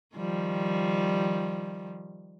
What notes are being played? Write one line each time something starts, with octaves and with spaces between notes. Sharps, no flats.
D#3 F3 G3